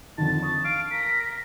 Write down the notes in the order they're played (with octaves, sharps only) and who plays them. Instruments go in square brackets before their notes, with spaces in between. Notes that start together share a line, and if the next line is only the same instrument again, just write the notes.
[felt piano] F2 D3 D#3 [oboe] A5
[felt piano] C#6 D#6
[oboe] F5 [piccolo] D7
[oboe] A#4 [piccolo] B6